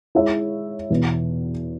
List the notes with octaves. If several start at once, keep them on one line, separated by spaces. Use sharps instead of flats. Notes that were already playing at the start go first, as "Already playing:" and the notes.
G#3 E4 C#5 E5
E2 B2 B3